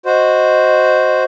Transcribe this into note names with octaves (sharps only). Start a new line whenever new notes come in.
F#4 C5 D#5